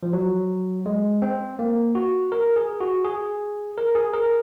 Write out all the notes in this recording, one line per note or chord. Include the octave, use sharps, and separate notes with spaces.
F3
F#3
G#3
C4
A#3
F#4
A#4
G#4
F#4
G#4
A#4
G#4
A#4